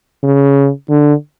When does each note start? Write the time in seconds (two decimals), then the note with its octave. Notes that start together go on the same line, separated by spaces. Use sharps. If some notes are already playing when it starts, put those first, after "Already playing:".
0.24 C#3
0.90 D3